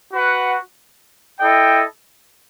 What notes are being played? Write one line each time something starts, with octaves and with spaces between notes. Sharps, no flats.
F#4 B4 F#5
E4 A4 D#5 G5